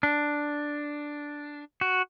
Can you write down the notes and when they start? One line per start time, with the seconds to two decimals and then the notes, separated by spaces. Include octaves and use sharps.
0.03 D4
1.81 F#4